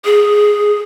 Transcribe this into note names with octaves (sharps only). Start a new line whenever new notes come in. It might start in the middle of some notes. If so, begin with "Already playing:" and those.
G#4